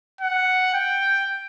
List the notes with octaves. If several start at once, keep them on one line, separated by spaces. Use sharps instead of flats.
F#5
G5